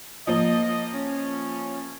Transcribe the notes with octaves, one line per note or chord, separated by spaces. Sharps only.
F3 A#3 D#5
C#4